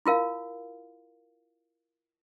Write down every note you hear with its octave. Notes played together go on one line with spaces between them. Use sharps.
E4 F4 A#4 F5